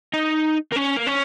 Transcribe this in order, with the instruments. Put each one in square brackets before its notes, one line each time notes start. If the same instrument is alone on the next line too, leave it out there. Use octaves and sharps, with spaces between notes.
[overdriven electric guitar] D#4
A#3
C#4
A#3
C#4